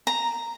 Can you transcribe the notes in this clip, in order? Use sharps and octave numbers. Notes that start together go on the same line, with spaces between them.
A#5